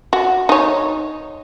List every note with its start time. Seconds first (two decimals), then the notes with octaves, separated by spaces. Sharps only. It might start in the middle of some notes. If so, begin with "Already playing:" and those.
0.13 F#4
0.49 D#4 C#5